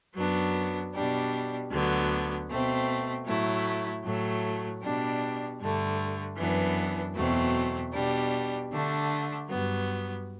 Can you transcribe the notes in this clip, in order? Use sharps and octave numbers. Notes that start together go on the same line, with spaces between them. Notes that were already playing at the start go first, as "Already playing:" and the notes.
F#2 F#3 B3 D4
B2 G3 D4
D2 D3 F#3 B3
B2 A3 C4
A2 F#3 A3 E4
A2 F#3 A3
B2 G3 D4
G2 D3 A3
F#2 E3 B3 D4
E2 B2 F#3 A3 C4
B2 G3 D4
D3 A3 D4
G2 F#3 B3